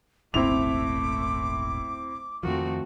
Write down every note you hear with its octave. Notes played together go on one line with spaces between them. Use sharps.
D#1 G#1 A3 C4 E4 D6 F7
F2 D#3 F3 A3 C4 F#4